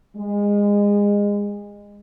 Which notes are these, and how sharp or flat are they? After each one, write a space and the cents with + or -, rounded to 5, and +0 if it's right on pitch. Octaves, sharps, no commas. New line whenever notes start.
G#3 -25